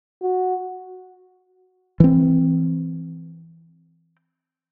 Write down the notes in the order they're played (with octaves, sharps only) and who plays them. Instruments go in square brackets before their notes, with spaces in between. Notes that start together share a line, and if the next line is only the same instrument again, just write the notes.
[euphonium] F#4
[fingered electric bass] E3 C4